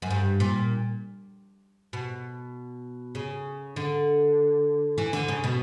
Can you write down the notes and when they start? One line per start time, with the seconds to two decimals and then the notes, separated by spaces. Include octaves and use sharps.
0.02 F#2
0.10 G2
0.40 A#2
1.93 B2
3.15 C#3
3.76 D3
4.98 E3
5.13 D3
5.28 C#3
5.44 B2